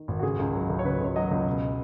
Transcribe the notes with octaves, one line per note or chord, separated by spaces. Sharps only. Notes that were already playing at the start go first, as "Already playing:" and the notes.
Already playing: D#3
G#1
F#4
C#3 G#4
C#2
F#3
C#2
C#5
C#3 B4
C#2 C#5
F#3 D#5
C#2
B2